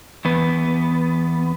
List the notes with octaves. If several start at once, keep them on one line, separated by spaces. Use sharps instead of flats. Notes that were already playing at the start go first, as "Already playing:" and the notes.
E2 B3